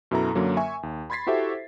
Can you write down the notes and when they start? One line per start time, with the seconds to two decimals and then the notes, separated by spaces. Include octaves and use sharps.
0.11 F#2 B2 E4 A4 A#5
0.35 F#2 D3 F#3 A#3
0.57 E5 G#5 C#6
0.83 D#2
1.10 B5 C6 G#6 A6 B6 C7
1.27 E4 F#4 G4 A4 C5 E5